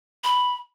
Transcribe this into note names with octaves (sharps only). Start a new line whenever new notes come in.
B5